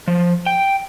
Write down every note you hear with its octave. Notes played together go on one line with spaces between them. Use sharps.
F3
G5